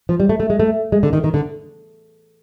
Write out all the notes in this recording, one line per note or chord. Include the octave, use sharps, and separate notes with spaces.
F3
G3
A3
A3
G#3
A3
G#3
D3
D#3
D#3
D3